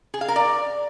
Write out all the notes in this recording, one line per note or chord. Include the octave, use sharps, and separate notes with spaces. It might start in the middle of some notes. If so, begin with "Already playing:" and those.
G#4
F5
A#4
D5